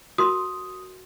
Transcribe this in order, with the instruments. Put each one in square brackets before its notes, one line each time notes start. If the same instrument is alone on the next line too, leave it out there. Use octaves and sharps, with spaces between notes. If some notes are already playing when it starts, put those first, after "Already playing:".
[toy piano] F#4 A#4 C6 [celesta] D#6